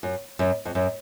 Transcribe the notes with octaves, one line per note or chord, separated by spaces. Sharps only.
F#2
F#2
F2
F#2